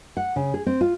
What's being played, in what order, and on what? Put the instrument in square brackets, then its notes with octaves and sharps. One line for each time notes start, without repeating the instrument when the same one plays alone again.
[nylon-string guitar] F#5
C#3
G#4
C4
F4